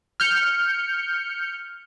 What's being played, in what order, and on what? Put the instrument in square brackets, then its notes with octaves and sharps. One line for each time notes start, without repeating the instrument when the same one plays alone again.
[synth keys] F6 G6 C#7